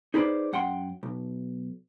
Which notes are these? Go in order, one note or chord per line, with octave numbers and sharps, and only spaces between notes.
D#4 G#4 B4 C5 D5
F#2 F#5 G5 C6
B1